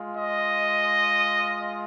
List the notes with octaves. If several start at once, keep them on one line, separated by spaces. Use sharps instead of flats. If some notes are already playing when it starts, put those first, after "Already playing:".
Already playing: G#3 F4
D#5